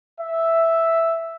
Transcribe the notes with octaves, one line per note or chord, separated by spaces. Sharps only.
E5